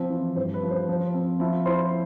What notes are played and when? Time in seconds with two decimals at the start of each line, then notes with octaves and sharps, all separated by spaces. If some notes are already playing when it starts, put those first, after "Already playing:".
Already playing: F3 C4 C5
0.10 E3
0.36 G2 C5
0.54 B4
0.63 F3
0.70 C5
0.89 F3 C5
1.14 C4
1.40 F3 E4 E5
1.66 E4 C5 C6